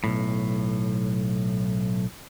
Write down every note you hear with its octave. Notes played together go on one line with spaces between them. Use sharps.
B1 A2